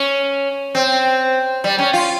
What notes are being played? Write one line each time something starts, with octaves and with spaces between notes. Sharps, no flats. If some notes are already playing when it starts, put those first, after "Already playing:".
Already playing: C#4
C4
G3
C#4
F4